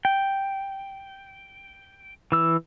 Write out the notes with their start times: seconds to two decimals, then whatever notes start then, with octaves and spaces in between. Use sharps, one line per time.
0.05 G5
2.32 E3 E6